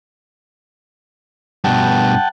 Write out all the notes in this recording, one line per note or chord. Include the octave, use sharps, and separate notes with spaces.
G2 B2 F#5 G5 A5